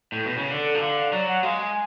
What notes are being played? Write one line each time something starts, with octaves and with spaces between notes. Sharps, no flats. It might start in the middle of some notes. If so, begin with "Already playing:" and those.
A2
B2
C#3
D3 A4
F3
D3 F5
F#3 D5
F#5
G#3 F5
G#5